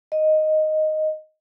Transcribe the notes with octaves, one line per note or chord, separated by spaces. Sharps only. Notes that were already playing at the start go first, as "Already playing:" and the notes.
D#5